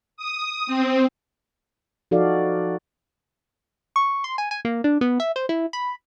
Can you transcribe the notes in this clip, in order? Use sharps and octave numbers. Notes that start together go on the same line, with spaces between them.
D#6
C4
F3 D#4 F#4 A4 D5 F5
C#6
C6
G#5
G#5
A#3
D4
B3
E5
C5
E4
B5